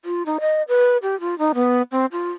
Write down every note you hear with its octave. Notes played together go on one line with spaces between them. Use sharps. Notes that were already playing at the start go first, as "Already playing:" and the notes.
F4
D#4
D#5
B4
G4
F4
D#4
B3
C4
F4